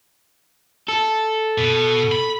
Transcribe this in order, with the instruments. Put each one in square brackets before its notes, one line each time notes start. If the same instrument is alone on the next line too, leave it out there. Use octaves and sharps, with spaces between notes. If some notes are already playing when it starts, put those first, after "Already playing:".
[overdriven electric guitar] A4
[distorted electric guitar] B2
B5